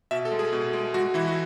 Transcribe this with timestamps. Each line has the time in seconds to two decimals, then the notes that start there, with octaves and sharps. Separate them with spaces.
0.11 B2 E5
0.25 A4
0.32 G#3
0.39 G#4
0.53 B2
0.73 G#3
0.94 G#3 F#4
1.14 E3 E4
1.28 F#4